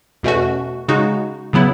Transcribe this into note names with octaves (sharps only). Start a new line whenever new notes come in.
E2 B2 A3 C#4 F#4
C#3 G#3 D#4 F#4
C#3 F#3 B3 E4